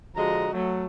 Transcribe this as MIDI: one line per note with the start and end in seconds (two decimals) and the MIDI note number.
0.16 0.48 50
0.16 0.48 53
0.16 0.48 56
0.16 0.48 66
0.16 0.48 75
0.16 0.48 82
0.53 0.86 54
0.53 0.86 57